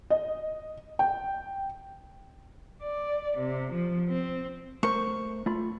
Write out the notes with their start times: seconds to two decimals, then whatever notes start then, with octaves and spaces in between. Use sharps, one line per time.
0.10 D#5
0.99 G5
2.83 D5
3.37 C3
3.72 F3
4.08 C4
4.83 A3 A#4 C5 C#6
5.46 A3 F4 B5